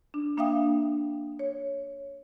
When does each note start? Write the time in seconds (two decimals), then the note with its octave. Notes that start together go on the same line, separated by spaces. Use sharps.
0.14 D4
0.37 A#3 D4 E5 F5 G5 D#6
1.39 C#5